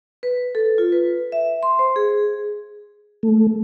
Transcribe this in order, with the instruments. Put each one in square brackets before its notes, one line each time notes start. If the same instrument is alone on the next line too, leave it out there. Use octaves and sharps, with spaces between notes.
[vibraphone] B4
A4
F4
B4
E5
C6
C5
G#4
[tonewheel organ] A3